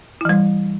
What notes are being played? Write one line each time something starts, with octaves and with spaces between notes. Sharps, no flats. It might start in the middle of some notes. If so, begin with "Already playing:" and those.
E3 G3 E4